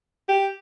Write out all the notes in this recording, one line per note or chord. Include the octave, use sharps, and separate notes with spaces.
G4